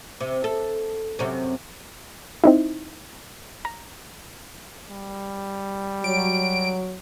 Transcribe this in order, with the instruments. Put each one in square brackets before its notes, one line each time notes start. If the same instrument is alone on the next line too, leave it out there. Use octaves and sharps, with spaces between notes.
[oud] C3
A4
F#2 C3 C#4
[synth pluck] C4 D#4 E4
A#5
[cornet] G3
[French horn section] F#3 [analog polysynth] D7